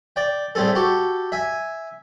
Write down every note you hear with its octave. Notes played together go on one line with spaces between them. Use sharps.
D5 G5
A2 G3 C4 G#4 A4
F#4 G4 A4
E5 G#5